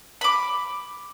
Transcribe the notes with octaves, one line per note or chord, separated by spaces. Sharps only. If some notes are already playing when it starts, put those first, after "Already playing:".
B5 D6